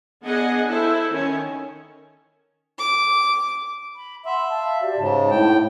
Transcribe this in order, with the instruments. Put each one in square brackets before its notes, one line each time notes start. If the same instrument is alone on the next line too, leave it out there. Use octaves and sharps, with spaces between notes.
[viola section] B3 D4 G#4 D#5 F#5 G#5
E4 A4 C5
D#3 C#4
[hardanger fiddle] D6
[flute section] B5
[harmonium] E5 [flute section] F#5 B5 C6
[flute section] F5 A5
F#4 G4 D5
[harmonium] G#2 C#3 [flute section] A5
[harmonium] A2 G5